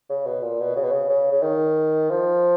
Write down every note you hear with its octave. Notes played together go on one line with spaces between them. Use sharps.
C#3
B2
A#2
B2
C#3
B2
C#3
C#3
C#3
D#3
F3